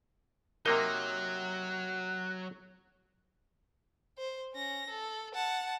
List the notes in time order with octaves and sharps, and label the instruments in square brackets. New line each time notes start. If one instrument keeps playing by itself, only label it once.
[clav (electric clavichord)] C3 A#3 D#4 [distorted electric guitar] F#3 [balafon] A#4 [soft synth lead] F#6
[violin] C5
C#4 A#6
A4
F#5 A5